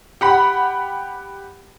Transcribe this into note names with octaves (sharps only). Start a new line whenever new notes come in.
G4 F#5 B5